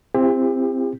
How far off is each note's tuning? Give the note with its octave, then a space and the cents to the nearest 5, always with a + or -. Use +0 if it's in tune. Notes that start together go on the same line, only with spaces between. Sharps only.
C4 +0 E4 +45 G4 +40